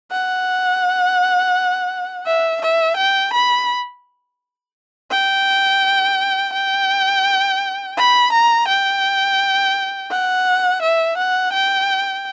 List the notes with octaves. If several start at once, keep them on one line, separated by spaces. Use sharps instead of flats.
F#5
E5
E5
G5
B5
G5
G5
B5
A#5
G5
F#5
E5
F#5
G5